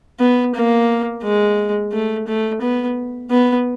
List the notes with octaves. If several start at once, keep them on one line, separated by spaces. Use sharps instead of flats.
B3
A#3
G#3
A3
A3
B3
B3